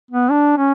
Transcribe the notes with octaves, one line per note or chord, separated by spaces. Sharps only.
B3
D4
C#4